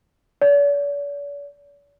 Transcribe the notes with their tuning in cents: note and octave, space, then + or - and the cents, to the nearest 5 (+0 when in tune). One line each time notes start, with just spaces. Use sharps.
D5 -45